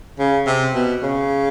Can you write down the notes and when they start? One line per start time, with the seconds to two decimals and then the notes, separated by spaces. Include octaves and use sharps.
0.19 C#3
0.47 C3
0.75 B2
1.03 C#3